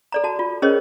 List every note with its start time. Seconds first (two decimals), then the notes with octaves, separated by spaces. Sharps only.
0.12 A4 D5 A#5
0.24 F#4 A5
0.39 F4
0.62 C#4 G#4 A#4 C5 C#5 D#5